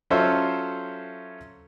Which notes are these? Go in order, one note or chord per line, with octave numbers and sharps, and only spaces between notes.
F#3 C#4 F4 A4 C5 E5